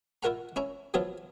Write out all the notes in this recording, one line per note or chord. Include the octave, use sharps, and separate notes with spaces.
E4 F4 A#4 F#5 A#5
C#4 E4 A#5
F3 F#3 B3 E4 F4